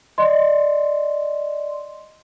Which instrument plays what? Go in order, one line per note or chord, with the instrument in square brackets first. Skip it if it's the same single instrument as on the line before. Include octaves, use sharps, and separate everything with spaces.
[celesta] D5 D#5 C6